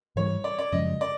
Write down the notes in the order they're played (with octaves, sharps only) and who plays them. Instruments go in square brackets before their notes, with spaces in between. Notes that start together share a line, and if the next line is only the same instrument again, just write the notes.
[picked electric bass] G#2 E3 G3 [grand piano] C#5
[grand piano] D5
D5
[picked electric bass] F#2 C#3 F3 G#3 [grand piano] D#5
[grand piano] D5